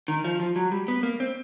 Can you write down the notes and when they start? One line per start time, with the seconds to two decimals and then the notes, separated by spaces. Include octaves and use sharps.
0.08 D#3
0.24 F3
0.40 F3
0.56 F#3
0.72 G3
0.88 B3
1.03 A#3
1.20 C4